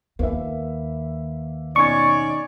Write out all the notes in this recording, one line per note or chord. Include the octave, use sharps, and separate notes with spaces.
D#2 A#3 B4 E5
B2 C#4 D#4 D5 C#6 G#6